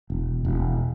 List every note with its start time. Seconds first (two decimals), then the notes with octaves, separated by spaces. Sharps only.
0.10 E1
0.45 E1